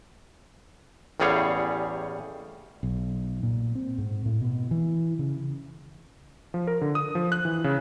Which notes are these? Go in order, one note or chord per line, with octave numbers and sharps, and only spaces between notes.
A1 E2 G3 G#4 C#5 F5
B1
A#2
C4
G#2
A2
B2
E3
C#3
F3
A#4
D3
D#6
F3
F#6
E3
C#3